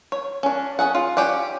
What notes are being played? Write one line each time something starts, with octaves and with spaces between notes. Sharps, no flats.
C#5
C#4 D4
C#4 G#4 F#5
F4
C#4 G4 D5 F#5